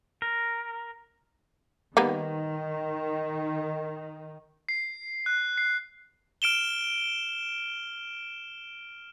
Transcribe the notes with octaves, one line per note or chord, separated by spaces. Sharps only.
A#4
D#3 G3 A#3 B3
C7
F#6
C7
F6 D7 E7 G7